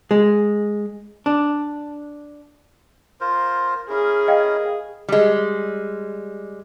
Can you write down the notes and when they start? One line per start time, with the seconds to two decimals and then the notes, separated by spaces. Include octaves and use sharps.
0.11 G#3
1.26 D4
3.21 F4 A#4 C5
3.89 C#4 E4 G#4 A#4
4.28 D#5 F5 G5
5.08 G3 G#3